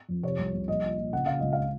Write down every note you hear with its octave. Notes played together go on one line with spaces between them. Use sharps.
F2
C3 C#5
C2
C2
A#1 D#5
A#2
A#2
C#3 F#5
C#3 F5
C#2 D#5
F5